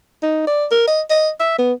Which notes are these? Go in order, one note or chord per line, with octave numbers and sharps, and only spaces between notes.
D#4
D5
A#4
D#5
D#5
E5
B3